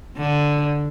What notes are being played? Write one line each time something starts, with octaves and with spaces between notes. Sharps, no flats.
D3